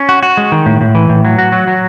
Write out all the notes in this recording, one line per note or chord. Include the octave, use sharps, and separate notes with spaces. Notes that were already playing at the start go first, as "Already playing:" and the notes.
Already playing: C#4
F#4
F#4
G#3
D#3
A2
A2
E3
A2
F#3
F#4
F#3
F#3